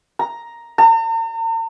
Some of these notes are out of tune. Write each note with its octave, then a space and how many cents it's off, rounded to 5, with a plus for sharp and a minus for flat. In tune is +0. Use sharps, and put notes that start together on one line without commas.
A#5 +5
A#5 -45